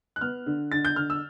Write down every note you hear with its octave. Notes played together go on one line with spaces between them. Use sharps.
F#6
B3 F6
D3
D3 A6
G6
D3 F6
E6